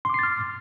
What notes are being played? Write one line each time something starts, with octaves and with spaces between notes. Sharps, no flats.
C6 D6 F6 A6 C7